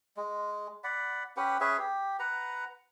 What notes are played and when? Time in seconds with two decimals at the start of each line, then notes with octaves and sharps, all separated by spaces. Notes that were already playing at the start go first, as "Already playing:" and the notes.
0.17 G#3
0.84 D5 F#5 B5
1.37 C#4 G4 B4 F#5
1.61 C#4 G#4 B4 E5
1.79 G4
2.19 B4 F#5 A#5